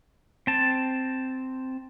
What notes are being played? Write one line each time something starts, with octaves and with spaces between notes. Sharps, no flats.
C4 A5